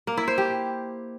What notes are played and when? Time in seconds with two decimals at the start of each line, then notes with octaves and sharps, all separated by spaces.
0.07 A#3
0.17 E4
0.28 C5
0.38 G4